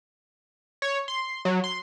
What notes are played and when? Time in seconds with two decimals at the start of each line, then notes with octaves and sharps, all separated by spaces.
0.82 C#5
1.08 C6
1.45 F#3
1.64 C6